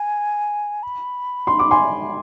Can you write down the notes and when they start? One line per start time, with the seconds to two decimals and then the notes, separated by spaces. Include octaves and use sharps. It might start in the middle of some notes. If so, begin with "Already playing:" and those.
Already playing: G#5
0.83 B5
1.47 C6
1.59 D6
1.71 G#5 C6